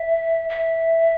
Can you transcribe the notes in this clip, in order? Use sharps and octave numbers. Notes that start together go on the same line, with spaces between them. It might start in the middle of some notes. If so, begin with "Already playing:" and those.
Already playing: E5
E5